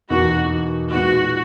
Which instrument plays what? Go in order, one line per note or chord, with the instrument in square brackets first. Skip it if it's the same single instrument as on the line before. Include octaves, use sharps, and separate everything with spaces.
[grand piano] E2 B2 A#3 D#4 [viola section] F#4
[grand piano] A#2 G#3 B3 D#4 [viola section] F#4